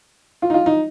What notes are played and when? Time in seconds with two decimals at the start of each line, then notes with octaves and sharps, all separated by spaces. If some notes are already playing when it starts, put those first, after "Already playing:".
0.42 F4
0.50 D#4
0.54 F4
0.66 D#4